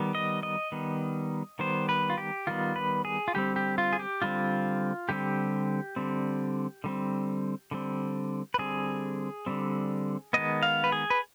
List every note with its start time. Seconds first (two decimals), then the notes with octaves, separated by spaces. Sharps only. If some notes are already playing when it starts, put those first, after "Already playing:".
Already playing: D#3 G3 B3
0.15 D#5
0.43 D#5
0.72 D#3 G3 B3
1.59 D#3 G3 B3 C5
1.89 B4
2.10 F4
2.18 G4
2.47 D#3 G3 B3 F4
2.76 B4
3.05 G#4
3.28 F4
3.34 D3 G3 C4 G4
3.56 G4
3.78 F4
3.93 G#4
3.99 G4
4.22 D3 G3 C4 F4
5.09 D3 G3 C4 G4
5.96 D3 G3 C4
6.84 D3 G3 C4
7.71 D3 G3 C4
8.54 B4
8.58 D3 G3 C4 G#4
9.46 D3 G3 C4
10.33 D#3 G#3 B3 D#5
10.63 F5
10.84 B4
10.92 G#4
11.10 B4